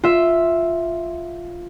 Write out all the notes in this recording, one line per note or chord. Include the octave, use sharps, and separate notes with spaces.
F4 E5